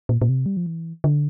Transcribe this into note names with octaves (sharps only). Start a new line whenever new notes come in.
A#2
A#2
C3
G3
F3
E3
D3